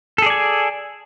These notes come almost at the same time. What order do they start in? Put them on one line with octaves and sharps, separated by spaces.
A4 G#4 D5 G#5